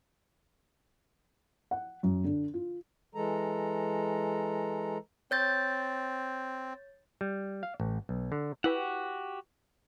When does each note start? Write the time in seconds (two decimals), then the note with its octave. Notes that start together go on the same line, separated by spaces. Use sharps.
1.71 F#5
2.03 F#2
2.24 D3
2.54 F4
3.15 E3 G#3 A4 A#5
5.31 C4 C#5 G6 A6
7.21 G3
7.63 F5
7.80 A1
8.09 B1
8.32 D3
8.64 E4 F#4 G4 B4 F#5 G5